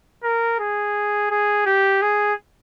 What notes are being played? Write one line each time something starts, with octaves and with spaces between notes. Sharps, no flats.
A#4
G#4
G#4
G4
G#4